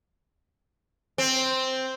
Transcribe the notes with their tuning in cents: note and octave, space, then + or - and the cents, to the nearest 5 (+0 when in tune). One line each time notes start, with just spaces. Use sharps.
C4 +0